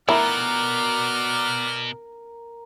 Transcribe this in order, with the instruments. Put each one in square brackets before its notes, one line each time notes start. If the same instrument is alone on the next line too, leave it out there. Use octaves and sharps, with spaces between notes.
[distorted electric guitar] B2 [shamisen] E4 [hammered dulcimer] A#4 [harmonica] D5 F#5 F6